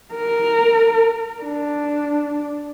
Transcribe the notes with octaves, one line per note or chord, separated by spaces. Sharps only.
A#4
D4